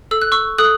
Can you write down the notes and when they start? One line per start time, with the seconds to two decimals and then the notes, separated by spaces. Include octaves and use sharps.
0.11 A4 E6
0.22 F#6
0.32 C#6 E6
0.58 A4 D#6 F#6